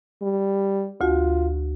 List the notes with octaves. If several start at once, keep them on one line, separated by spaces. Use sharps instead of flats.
G3
D2 F4 F#4